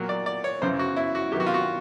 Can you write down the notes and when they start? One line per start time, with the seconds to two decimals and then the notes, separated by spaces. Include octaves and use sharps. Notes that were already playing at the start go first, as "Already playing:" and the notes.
Already playing: A#2 F#3 A#3
0.09 D5
0.26 D5
0.44 C#5
0.62 F#2 C#3 E3 C5
0.79 F#4
0.96 E4
1.15 F#4
1.32 C3 D#3 F#3 B3 G4
1.40 F#4
1.46 F4
1.54 F#4